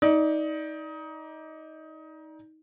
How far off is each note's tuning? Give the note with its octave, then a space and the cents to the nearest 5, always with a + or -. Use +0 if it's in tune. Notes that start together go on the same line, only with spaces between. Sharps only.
D#4 +20 D5 +0